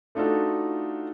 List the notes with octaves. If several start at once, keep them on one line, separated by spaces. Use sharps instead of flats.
A3 D4 D#4 F4 F#4 A4